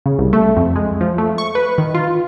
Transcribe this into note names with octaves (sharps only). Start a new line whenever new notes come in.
C#3
C2
A3
F2
G#3
F3
A3
C#6
B4
D#3
F4